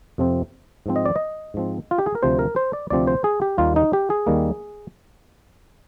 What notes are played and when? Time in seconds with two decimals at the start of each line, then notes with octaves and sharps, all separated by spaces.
0.18 F2 C3 F3 C4
0.86 G#2 F3 C4
0.96 D#5
1.06 D5
1.16 D#5
1.54 G#2 F3 C4
1.91 F4
1.98 G4
2.06 G#4
2.15 A#4
2.23 D2 C3 F3 C4 C5
2.39 A#4
2.56 C5
2.73 D5
2.90 D2 C3 F3 C4 D5
3.07 C5
3.24 G#4
3.42 G4
3.58 D#2 D#3 G3 A#3 F4
3.76 D#4
3.93 G4
4.10 G#4
4.27 D#2 D#3 G3 A#3